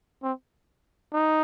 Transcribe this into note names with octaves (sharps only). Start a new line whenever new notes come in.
C4
D#4